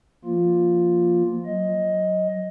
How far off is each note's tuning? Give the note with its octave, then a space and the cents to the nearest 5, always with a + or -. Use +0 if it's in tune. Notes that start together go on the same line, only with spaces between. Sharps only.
F3 -20 A#3 +0 F4 +0
F#3 +0 D#5 +10